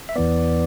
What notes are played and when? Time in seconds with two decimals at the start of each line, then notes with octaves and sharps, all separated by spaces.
0.09 E5
0.16 E2 E3 B3 D5